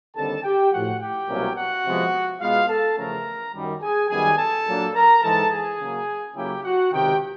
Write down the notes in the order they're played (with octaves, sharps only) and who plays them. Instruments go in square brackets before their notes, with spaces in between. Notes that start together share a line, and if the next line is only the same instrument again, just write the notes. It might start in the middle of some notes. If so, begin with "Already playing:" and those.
[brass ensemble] D#2 D3 G3 C4 A4 A5
G4 G5
A2 F3 A3 F#4 F#5
G4 G5
C2 B2 F#3 A#3 C#4
F#4 F#5
C3 F3 G#3 B3
B2 G#3 B3 F4 F5
A4 A5
E2 C#3 F3 A3 C#4 A#4 A#5
F#2 D#3 G3
G#4 G#5
F#2 D#3 G3 B3 G#4 G#5
A4 A5
A#2 F#3 A#3 D4
A#4 A#5
G#2 E3 G#3 A4 A5
G#4 G#5
C#3 F#3 A#3
C#3 F#3 A#3 C#4 E4 G4 G5
F#4 F#5
C#2 C3 D#3 G4 G5